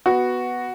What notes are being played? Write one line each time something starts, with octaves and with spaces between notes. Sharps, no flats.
B3 F#4